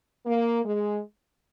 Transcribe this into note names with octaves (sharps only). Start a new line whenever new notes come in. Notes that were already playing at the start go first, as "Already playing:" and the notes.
A#3
G#3